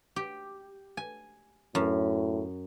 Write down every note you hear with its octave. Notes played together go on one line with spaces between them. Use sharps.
G4
G#5
F#2 A2